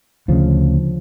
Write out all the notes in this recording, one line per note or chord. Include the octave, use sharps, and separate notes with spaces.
D2 C#3 F3